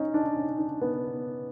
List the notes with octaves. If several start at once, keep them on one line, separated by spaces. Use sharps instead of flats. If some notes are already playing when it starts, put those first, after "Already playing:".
Already playing: C#4 D#4
D4
C#4
D4
B3